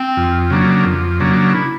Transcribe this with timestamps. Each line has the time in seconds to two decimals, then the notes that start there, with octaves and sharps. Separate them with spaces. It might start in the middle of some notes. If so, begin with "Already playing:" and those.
Already playing: C4
0.17 F2
0.50 C#3 F#3 A#3 D4
0.85 F2
1.20 C#3 F#3 A#3 D4
1.53 E4